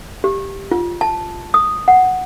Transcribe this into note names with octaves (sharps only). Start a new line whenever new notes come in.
G4
F4
A5
D#6
F#5